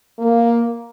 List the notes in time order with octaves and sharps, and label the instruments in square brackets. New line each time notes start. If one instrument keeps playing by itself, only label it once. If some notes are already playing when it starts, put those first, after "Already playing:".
[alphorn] A#3